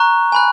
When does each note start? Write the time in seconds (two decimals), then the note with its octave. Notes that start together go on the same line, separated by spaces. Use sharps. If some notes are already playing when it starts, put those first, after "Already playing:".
Already playing: A#5 C#6 F#6
0.32 G#5 B5 F#6